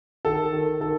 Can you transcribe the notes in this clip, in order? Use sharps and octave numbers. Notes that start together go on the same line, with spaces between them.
D#3 A4
D#3
D#3 A4